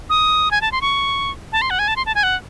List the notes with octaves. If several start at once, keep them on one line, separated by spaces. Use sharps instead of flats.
D#6
G#5
A5
C6
C#6
A5
C6
F#5
G#5
A5
C6
A5
G#5
F#5